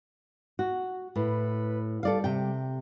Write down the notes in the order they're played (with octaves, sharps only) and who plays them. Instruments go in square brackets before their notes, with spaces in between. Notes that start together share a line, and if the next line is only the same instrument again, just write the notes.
[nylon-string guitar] F#4
[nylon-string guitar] A2 [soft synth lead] B4
[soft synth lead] G3 [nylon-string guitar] A4 D5 F5
[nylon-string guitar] C3 G5